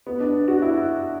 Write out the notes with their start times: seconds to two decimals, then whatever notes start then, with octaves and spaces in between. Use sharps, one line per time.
0.07 B3
0.20 D4
0.48 F#4
0.62 E4